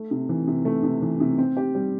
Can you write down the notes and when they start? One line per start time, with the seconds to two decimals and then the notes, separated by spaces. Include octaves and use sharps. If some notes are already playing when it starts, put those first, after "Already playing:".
Already playing: A3
0.11 C3
0.29 E3
0.47 C3
0.65 A3
0.83 C3
1.02 E3
1.20 C3
1.38 C4
1.57 G4
1.75 G3